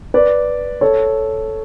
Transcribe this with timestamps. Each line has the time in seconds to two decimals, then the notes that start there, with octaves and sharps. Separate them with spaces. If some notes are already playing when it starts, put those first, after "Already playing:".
0.14 B4 D5
0.81 A4 C#5